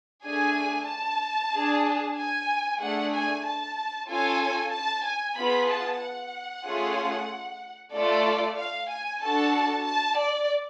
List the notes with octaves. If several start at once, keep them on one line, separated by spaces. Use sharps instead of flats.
A3 D4 G#4 G#5
A5
D4 G#4
G#5
A3 D4 G#4 F#5
G#5
A5
C#4 F4 A4 G#5
A5
G#5
B3 F4 G#4 B5
A5
F#5
A3 C#4 F4 G#4
A3 F4 A4 D5
F5
G#5
D4 F#4 A4 A5
A5
D5